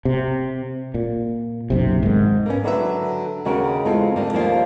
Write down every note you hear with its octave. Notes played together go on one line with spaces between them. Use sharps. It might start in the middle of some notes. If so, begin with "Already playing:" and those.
C3
A#2
F#1 B1 C3
G#2 D#3
A#3 B3 C#4
D3 F#3 F#4 B4 C#5 E5
D#2 C#3 F#4 G4 A#4
E2 G#3 C4 F4 A4
D3 G3 A#3
D#2 F3 G3 A#3 F5